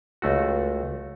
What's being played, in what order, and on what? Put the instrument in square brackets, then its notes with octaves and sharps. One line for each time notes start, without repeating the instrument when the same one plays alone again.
[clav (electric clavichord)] C#2 A3 F#4